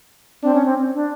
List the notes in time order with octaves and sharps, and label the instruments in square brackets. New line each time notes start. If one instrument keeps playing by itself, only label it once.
[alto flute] C4 [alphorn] D4
[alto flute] C#4
C4
D4